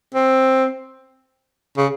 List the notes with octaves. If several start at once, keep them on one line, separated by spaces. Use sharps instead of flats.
C4
C#3